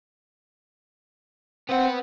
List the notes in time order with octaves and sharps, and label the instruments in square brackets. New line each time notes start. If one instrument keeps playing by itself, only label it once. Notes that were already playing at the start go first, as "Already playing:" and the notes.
[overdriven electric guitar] B3 F#5 [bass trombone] C4